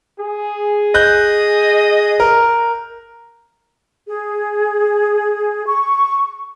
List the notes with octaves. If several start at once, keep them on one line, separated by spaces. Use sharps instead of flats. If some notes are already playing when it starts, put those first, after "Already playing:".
G#4
D#5 F#6 G6
A#4
G#4
C#6